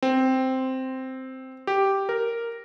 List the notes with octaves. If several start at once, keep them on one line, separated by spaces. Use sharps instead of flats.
C4
G4
A#4